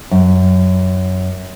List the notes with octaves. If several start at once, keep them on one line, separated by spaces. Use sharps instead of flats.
F#2